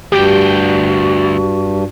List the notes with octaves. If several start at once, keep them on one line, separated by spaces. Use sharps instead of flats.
D2 G2 F#4 G4 G5